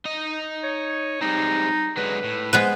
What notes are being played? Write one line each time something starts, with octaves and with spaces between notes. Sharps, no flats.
D#4 D#5
C#5
G3 G#3 C4 D#4
D3 F#3 G#3 B4
A2
G#3 B3 B4 C5